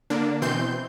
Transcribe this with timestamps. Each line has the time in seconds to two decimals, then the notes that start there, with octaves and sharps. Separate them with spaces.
0.10 D3 A#3 D4
0.42 B2 E3 C4 C6 G6